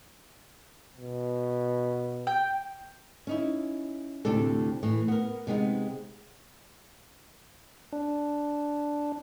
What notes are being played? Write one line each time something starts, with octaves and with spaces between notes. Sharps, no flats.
B2
G5
C#4 D#4 E4
D2 A2 C3 D4 A4
A2 E3
B3 A#4
C3 G#3 B3 D#4
D4